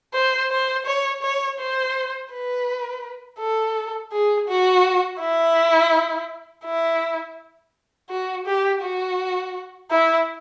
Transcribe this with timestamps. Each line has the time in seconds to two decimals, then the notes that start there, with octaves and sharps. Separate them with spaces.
0.13 C5
0.51 C5
0.86 C#5
1.22 C#5
1.59 C5
2.31 B4
3.39 A4
4.12 G#4
4.48 F#4
5.20 E4
6.65 E4
8.10 F#4
8.46 G4
8.82 F#4
9.90 E4